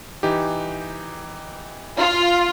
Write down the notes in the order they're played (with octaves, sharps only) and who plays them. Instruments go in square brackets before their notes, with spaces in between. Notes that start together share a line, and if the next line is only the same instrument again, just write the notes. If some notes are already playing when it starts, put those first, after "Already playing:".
[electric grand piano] E3 D#4 G4
[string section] F4